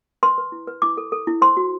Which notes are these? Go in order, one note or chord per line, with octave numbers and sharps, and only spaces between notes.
B4 C6
B4
E4
B4
E4 D6
A4
A4
E4
C5 C6
F#4